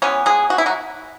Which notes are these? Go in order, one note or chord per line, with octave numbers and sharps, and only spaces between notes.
E3 G#3 B3 C#4 C#5
G#3 G#4
F#4
E4
F#3 F#4